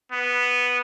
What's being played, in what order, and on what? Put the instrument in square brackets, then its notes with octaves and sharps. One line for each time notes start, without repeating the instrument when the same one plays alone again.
[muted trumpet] B3